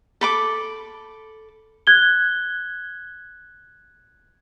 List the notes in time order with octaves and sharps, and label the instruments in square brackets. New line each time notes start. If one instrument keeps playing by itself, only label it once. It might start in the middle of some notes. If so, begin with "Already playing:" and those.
[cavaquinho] A4 B5 D6
[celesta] F#6 G#6 G7